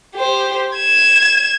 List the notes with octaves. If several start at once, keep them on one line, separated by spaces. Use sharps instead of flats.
G4 C5
G#6 E7